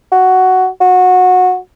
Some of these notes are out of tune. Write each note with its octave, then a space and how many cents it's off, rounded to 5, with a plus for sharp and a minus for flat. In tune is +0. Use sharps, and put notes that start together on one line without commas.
F#4 +10
F#4 -20